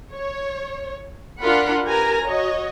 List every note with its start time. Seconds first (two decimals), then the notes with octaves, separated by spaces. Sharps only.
0.13 C#5
1.42 D4 F4 A#4 F#5 B5
1.84 G4 A#4 B4 G#5 A#5
2.23 F#4 C#5 D#5